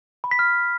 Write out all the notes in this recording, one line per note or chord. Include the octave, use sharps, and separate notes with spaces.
B5
B6
F6